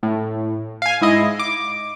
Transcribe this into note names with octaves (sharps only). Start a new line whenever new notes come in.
A2
F5 G#5
G#2 E4 D#5
D6